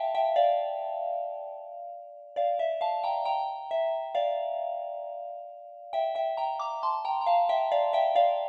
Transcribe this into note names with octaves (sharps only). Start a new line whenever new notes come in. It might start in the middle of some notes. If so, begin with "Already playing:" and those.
Already playing: E5 F5 G5 A5
E5 G5
D5 F5
D5 F5
E5
F5 A5
G5 A#5
G5 A#5
E5
D5 F5
E5 G5
E5 G5
G5 A#5
A#5 D6
A5 C6
G5 A#5
A#5
F5 A5
E5 G5
D5 F5
E5 G5
D5 F5